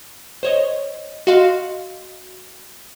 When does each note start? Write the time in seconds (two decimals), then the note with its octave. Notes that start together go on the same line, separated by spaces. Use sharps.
0.43 C5 C#5 D#5
1.27 F#4 D#5 F5 C6